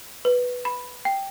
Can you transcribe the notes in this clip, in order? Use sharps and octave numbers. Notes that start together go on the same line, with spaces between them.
B4
B5
G5